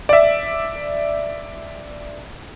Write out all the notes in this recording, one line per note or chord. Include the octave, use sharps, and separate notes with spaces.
D5 E5